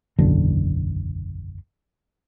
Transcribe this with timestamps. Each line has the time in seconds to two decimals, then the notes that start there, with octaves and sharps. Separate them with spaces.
0.18 F#1 B1 E2 D3